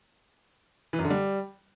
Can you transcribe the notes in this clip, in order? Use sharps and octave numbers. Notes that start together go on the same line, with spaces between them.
E3
F#2
D3
G3